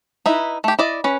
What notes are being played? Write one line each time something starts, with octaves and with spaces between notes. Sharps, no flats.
D#4 E4 B4
A3 G4
E4 D5 D#5
C#4 B4